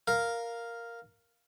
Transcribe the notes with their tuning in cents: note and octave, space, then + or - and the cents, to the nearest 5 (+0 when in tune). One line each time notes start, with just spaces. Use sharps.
A#4 +0 F5 +0